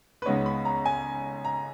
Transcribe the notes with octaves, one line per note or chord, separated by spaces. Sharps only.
B4
C#2 C#3 G#3 B3 D#4 C#5
B5
A#5
G#5
A#5